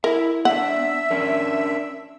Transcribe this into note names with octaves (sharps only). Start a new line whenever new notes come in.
E4 A#4 E5
B3 D4 E5 F#5
C#4 D4 A#4